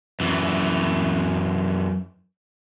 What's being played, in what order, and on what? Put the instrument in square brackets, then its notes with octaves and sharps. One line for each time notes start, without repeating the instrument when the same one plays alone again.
[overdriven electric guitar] F#2 E3